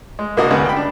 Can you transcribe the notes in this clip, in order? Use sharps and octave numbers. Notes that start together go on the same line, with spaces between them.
G#3
C2 A#3 D4 F#4 D#5
D2 G2 C#3 G3 G#3 B3
G5 B5
D4